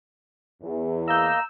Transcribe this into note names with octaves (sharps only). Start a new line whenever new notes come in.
E2
A#3 D#5 A#5 E6 G6